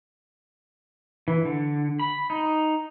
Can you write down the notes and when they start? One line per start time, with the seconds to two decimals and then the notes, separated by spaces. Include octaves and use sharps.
1.28 E3
1.45 D3
1.99 B5
2.30 D#4